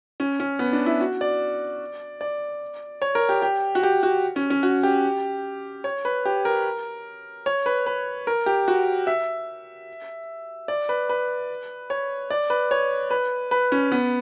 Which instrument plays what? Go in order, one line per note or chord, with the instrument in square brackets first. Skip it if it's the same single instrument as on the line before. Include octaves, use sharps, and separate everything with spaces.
[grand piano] C#4
C#4
B3
D4
E4
F#4
D5
D5
C#5
A#4
G4
G4
F#4
G4
F#4
C#4
C#4
F#4
G4
C#5
B4
G4
A#4
C#5
B4
B4
A#4
G4
F#4
E5
D5
B4
B4
C#5
D5
B4
C#5
B4
B4
C#4
B3